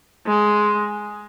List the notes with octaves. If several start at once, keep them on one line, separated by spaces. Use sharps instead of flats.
G#3